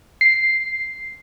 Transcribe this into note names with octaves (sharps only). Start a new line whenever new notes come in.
C7